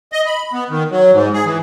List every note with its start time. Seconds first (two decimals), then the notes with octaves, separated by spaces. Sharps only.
0.12 D#5
0.26 B5
0.53 B3
0.70 D#3
0.91 F#3
1.13 G#2
1.33 G#4
1.46 E3